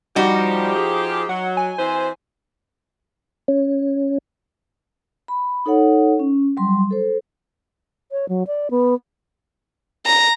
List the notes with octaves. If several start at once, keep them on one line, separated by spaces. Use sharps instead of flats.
F3 G3 D#4 F#4 G4
G#4
F#3 F#5
G#5
E3 C4 C5
C#4
B5
D#4 A4 C#5 F#5
C#4
F#3 G3 C6
A4 C5
C#5
F#3
D5
B3
A#5